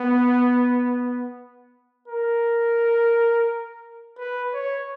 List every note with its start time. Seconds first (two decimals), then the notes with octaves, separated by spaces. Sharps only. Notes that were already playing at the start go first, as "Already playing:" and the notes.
Already playing: B3
2.08 A#4
4.18 B4
4.54 C#5